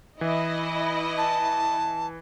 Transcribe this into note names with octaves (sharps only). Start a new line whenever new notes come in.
E3 E4 D#5
A5